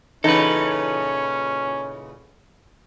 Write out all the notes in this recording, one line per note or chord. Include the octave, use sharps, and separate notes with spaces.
A#2 C#3 E3 C#4 D#4 A4 B4